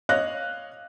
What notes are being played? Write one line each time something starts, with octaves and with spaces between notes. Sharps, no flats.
C#5 D#5 F5 F#6 A#6